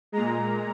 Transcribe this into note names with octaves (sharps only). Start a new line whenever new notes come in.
A#2 G#3 A#5